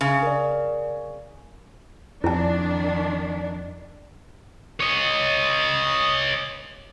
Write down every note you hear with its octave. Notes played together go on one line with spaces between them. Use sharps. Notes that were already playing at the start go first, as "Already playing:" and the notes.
C#3
A#4 D5
F2 D#3 D4 E4 A5
C#5 D#5